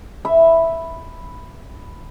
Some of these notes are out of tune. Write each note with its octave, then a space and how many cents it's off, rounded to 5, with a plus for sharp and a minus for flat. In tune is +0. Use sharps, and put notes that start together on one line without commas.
E5 +0 B5 +0